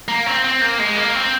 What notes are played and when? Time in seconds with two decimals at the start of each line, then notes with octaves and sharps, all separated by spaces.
0.08 A#3
0.26 C4
0.44 C4
0.62 A#3
0.80 G#3
0.97 A#3
1.15 C4